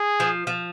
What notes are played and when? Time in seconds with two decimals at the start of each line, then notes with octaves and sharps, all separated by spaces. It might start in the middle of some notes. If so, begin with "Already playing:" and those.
Already playing: G#4
0.20 F3
0.47 F3